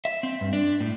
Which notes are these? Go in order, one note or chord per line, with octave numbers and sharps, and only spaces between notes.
E5
C4
G2
D4
A2